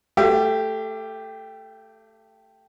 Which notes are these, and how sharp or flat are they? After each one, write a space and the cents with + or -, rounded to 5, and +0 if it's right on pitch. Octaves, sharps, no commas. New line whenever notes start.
A3 +0 G4 +0 E5 +45